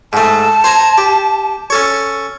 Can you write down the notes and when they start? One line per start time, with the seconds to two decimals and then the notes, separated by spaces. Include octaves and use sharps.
0.13 G#2 A3 A5
0.64 C5 G#5 A#5
0.98 G4
1.70 C#4 A4 C#5